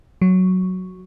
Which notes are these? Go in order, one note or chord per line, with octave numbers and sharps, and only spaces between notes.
F#3